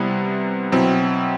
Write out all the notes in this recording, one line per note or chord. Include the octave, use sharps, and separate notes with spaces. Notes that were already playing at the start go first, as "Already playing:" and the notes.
Already playing: C3 G3 B3 E4
B2 F#3 C4 E4